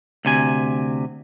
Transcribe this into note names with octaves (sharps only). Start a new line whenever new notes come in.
D2 C3 G#5